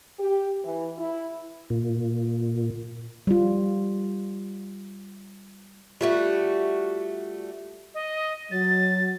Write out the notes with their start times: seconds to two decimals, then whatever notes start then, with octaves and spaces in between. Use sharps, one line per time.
0.19 G4
0.64 E3
0.98 E4
1.70 A#2
3.27 G3 F4
6.01 G3 A3 F4 F#4 E5
7.94 D#5
8.51 F#3 A6